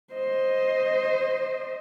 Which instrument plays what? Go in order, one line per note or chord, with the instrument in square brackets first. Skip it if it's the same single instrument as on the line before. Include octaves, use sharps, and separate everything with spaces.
[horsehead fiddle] C5 D#5